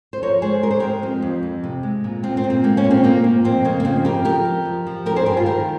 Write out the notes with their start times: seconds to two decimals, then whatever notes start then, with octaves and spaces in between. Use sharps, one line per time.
0.13 C5
0.22 F3 A#4 C#5
0.42 G#3 G#4 C5
0.63 G#3 A#4
0.71 C5
0.80 G#3 G4 A#4
1.02 F2 C4
1.22 F2
1.43 F2
1.64 C3
1.83 G#3
2.04 A#2
2.23 A#2 C4
2.37 C4
2.44 A#2
2.50 C4
2.64 G#3 A#3
2.77 A#3 C#4
2.84 A#2
2.91 C4
3.04 A#2 A#3
3.24 A#2
3.44 F2 C4
3.65 C#3 A#3
3.80 A#3
3.85 F2 C4
4.05 C#3 G4 A#4
4.25 F3 G4 A#4
4.45 F2
4.65 F3
4.87 F3
5.06 G3 G4 A#4
5.16 G#4 C5
5.26 G2 G4 A#4
5.37 F4 G#4
5.46 D#3 G4 A#4